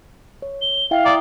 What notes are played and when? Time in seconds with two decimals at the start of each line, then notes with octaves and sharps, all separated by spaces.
0.42 C#5
0.62 G7
0.91 E4 E5 F5 G5
1.06 D5 A#5 D#6